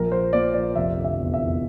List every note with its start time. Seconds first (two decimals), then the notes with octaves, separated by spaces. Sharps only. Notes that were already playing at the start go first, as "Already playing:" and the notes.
Already playing: A#1 A#4
0.12 A#1 C5
0.33 A#2 D5
0.54 A#1 D5
0.76 F1 E5
0.98 D3
1.04 E5
1.19 E2
1.34 E5
1.40 E2